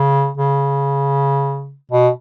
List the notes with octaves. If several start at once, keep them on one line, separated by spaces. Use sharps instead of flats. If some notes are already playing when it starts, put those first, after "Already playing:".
Already playing: C#3
C#3
B2